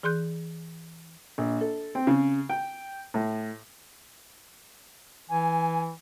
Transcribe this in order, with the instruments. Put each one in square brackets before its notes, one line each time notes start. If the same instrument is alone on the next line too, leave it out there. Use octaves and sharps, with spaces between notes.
[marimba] E3 G#4 C6 F#6 G6
[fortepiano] A#1
A4
C4
C#3
G5
A2
[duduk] E3 [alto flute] G#5